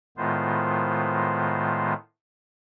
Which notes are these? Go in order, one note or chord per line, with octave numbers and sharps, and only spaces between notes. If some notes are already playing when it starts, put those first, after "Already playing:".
A2 D#3 G#3 B3 F4 C5